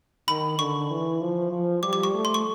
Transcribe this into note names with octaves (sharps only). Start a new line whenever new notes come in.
D#3 B5
D3 C#6
E3
F3
F3
G3 D6
D6
C#6
A3
C6
C#6